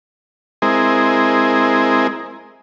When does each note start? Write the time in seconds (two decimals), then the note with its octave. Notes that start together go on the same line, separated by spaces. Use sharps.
0.62 G#3 C4 E4 G#4 A#4 D#5